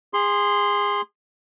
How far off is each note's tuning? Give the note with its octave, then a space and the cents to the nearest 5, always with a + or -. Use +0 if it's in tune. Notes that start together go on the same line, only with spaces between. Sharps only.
G#4 -25 C6 +0